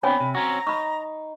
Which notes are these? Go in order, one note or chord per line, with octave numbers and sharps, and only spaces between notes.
B3 C4 D4 C#5 G5 G#5 B5
C3
C4 C#4 F#4 A#5
D#4 B5 C#6